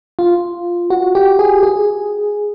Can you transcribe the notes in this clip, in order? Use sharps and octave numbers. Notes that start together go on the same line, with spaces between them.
F4
F#4
G4
G#4
G#4